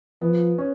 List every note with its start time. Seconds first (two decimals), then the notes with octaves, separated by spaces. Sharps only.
0.22 F3 B3
0.58 C#4